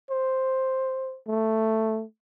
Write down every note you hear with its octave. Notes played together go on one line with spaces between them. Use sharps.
C5
A3